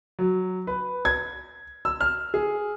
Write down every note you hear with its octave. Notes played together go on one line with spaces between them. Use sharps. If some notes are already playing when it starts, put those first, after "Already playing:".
F#3
B4
G#6
E6
F6
G#4